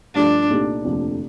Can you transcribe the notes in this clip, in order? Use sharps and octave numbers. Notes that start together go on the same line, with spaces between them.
G2 F3 A3 D4
C2 A#2 A3 D#4 G4
F1 D#2 D3 F3 C4